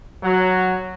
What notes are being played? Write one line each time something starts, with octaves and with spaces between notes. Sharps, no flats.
F#3